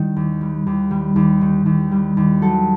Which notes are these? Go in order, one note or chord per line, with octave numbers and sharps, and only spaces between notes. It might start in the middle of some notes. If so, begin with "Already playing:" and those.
Already playing: D#3 G3
D#2
G3
D#2
G3
D#2
D#3
D#2
G3
D#2
F#3 A4